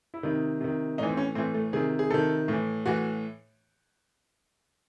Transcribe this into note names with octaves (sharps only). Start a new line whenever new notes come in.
E4
C3 D#3 D#4
C3 D#3
A2 E3 D#4
C4
C#4
A2 E3 C4
A3
C3 D#3 G#4
G#4
C3 D#3 A4
A2 E3
A2 E3 F#4